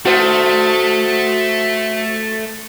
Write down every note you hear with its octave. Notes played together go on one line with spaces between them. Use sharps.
A3 F#4 C5